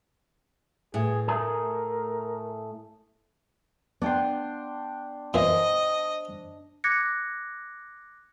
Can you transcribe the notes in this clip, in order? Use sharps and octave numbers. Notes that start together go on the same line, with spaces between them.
A2 G#4
A3 G#4 A#4
B3 D4 G5 C6
A#2 E3 C5 D#5
D6 F#6 G#6 A#6 C#7